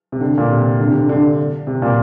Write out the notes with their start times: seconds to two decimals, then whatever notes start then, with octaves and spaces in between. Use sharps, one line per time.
0.12 C3
0.21 D3
0.38 A#2
0.50 C3
0.80 D3
0.87 C3
0.94 D3
1.09 D3
1.67 C3
1.82 A#2